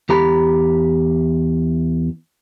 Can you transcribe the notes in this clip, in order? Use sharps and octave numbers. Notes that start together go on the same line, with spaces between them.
E2 G4 A#5 B5